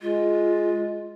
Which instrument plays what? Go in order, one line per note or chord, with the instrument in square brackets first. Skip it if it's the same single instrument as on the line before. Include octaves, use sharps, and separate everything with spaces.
[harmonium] G#3 [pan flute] F4